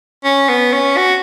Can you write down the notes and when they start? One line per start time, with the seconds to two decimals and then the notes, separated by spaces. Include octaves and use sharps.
0.24 C#4
0.49 B3
0.73 C#4
0.97 F#4